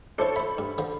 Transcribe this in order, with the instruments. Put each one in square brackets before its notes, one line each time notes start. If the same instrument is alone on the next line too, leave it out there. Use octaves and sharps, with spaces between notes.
[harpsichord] D4 E4 [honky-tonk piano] A4 C5 C#5
[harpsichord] C5 E5 [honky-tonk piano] B5
[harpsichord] G2
D3 F3 C5